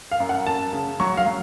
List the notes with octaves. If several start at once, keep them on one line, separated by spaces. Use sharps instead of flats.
F5
F#2
F#5
F#2 A5
C#3
F#3 C#6
F5
F#3